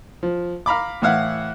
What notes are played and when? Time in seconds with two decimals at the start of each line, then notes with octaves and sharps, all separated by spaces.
0.23 F3
0.66 F5 A#5 B5 D6
1.02 A2 E3 E4 F5 F#5